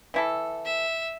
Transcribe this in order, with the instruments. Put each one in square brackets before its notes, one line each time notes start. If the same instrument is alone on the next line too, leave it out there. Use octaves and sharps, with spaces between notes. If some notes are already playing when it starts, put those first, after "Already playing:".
[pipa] E3 E4 A4
[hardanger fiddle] E5